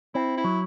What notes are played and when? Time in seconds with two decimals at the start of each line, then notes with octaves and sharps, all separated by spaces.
0.14 C4 E4
0.37 E4
0.44 F#3